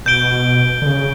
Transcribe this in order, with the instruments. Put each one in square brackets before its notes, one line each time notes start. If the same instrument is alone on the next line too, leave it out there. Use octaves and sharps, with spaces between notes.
[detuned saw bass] B2 [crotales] G6 D7 G7
[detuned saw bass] D3
C#3